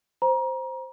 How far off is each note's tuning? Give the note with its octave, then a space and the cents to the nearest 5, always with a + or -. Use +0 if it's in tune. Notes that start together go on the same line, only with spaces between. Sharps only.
C5 +0 A#5 +30